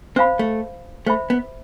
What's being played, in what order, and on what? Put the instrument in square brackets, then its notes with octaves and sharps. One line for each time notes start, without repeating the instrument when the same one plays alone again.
[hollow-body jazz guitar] C4 [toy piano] C5 F5 B5
[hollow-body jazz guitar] A3
[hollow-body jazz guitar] A3 [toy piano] C5 E5 B5
[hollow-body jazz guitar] B3